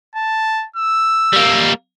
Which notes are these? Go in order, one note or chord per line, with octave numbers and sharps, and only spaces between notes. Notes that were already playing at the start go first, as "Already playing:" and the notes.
A5
E6
G3 A#3